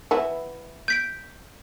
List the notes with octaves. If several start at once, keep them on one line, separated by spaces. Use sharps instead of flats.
E3 B3 E4
G6 B6 D7